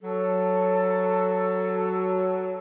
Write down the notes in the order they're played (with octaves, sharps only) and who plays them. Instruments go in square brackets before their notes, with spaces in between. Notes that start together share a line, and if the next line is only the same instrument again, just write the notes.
[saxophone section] F#3 [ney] A4